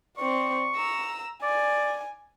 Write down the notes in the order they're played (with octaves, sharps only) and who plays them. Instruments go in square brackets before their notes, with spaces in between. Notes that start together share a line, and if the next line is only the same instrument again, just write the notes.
[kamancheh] C4 D5 [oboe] C#6
[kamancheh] A#5 E6
[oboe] D5 [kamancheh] G#5